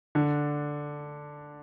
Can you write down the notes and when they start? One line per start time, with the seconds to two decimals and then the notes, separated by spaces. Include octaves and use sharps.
0.15 D3 D4